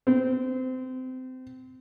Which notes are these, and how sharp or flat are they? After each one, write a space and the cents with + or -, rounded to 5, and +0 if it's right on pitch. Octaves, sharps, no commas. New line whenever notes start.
C4 -25